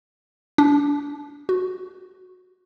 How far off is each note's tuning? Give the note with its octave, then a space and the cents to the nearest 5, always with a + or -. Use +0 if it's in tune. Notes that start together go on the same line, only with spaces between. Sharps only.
D4 -30
F#4 -15